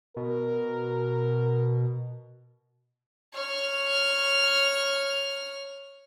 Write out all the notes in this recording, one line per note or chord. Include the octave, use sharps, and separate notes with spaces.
B2 A#4
C#5 F6